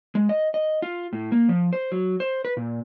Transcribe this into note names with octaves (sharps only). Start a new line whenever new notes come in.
G#3
D#5
D#5
F4
A2
A#3
F3
C5
F#3
C5
B4
A#2